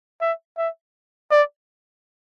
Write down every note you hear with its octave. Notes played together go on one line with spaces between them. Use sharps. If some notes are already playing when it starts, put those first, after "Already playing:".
E5
E5
D5